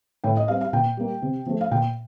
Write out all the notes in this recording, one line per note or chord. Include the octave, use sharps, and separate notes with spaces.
A2 G5
D#5
G3 C4 F5
F5
A#2 G5
G3 A#3
C3
F3 A3
F5
A#2 G5